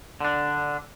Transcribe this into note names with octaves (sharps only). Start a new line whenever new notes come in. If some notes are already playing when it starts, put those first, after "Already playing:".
D3 D4